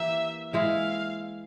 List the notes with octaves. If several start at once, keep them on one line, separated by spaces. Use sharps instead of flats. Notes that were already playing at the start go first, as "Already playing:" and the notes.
Already playing: E3 A#3 E4 G4 E5
E3 G#3 E4 F5